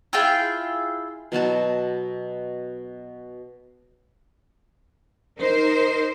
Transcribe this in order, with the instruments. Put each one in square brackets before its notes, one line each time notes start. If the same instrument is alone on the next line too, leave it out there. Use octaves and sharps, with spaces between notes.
[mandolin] E4 F4 G#4 G5
[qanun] B2 F#3 F#4 A5
[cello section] D#4 A#4 C5